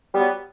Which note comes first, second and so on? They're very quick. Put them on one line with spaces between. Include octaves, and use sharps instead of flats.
G3 B3 F#3